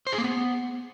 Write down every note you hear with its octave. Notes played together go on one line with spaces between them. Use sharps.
C5
G#4
A#3
B3